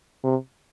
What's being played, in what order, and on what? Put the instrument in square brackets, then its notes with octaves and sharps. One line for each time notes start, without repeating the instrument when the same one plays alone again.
[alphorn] C3